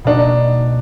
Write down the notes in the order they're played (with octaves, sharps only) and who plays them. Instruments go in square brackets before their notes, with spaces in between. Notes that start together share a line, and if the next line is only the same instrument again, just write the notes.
[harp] B2 A#3 D#4 F#4 [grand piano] D4